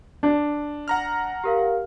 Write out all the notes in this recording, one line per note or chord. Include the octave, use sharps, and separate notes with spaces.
D4
F#5 A#5 F6
G4 A#4 F5